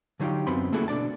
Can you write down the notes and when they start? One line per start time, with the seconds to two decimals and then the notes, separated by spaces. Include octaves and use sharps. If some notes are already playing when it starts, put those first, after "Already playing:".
0.20 D3 F#3 D#4 F4 G4
0.47 F#2 B3 C4 B5 C6
0.72 A3 A#3 E4 F#4 G#4 A4
0.88 B2 D4 D5 A5